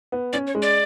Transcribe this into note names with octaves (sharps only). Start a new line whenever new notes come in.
B3
C#4 D5
C#5
G#3
D5